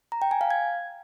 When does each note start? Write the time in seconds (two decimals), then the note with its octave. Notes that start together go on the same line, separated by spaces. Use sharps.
0.12 A#5
0.22 G5
0.31 G#5
0.41 F5
0.50 G#6